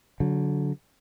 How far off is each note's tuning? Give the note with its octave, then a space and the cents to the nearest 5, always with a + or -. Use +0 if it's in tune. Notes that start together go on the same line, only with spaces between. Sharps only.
D3 -25 F#3 +0